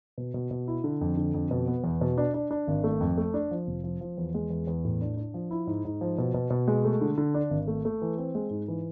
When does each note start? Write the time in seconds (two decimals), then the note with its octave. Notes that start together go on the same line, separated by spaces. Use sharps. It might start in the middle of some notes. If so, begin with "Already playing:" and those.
0.18 B2
0.34 B2
0.51 B2
0.68 E4
0.84 D3
1.01 F2
1.17 D3
1.34 F2
1.51 B2
1.68 B3
1.84 E2
2.01 B2
2.18 D4
2.34 D4
2.51 D4
2.68 G#1
2.84 A3
3.00 F2
3.18 A3
3.34 D4
3.51 F3
3.67 F1
3.84 F3
4.01 F3
4.18 E2
4.34 G#3
4.50 E2
4.67 E2
4.84 A2
5.01 D4
5.17 D4
5.34 F3
5.51 E4
5.67 G#2
5.85 G#2
6.01 F3
6.18 B2
6.34 B2
6.50 B2
6.68 G#3
6.85 A3
7.01 D3
7.18 D3
7.34 D4
7.50 G#1
7.68 A3
7.85 A3
8.02 E3
8.18 C4
8.35 G#3
8.51 G#2
8.68 E3